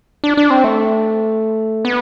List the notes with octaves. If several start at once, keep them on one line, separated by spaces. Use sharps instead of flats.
D4
D4
C4
A3
B3